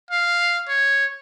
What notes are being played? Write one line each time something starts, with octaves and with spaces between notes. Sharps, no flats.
F5
C#5